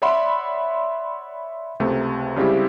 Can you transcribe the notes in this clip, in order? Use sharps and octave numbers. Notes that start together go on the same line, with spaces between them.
C#5 D5 E5 F#5 B5 C6
C#2 C3 A3 C4 G#4
C#3 G3 G#3 C4 E4 G4